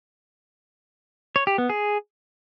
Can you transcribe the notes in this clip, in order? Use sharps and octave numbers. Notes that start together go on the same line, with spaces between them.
C#5
G4
B3
G#4